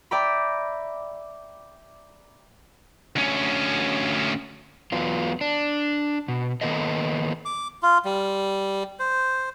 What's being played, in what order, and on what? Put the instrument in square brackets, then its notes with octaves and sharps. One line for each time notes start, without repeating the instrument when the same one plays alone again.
[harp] D5 E5 G5 A#5 B5
[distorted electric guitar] D2 C#4
[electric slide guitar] E2 F#3 B3 F4
D4
B2
D#3 F3 A#3 B3 A4 D#5
[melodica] D6
F4
G3
C5